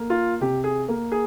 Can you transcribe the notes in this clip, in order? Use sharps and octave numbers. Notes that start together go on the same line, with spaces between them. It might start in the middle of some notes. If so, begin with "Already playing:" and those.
Already playing: A#3
F4
C3 G4
G#4
A#3
G#4